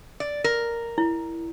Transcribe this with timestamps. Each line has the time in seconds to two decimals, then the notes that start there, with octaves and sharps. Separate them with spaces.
0.20 D5
0.44 A#4
0.98 E4